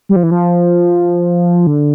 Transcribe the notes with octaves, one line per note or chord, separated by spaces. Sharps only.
G3
F3
E3
F3
D3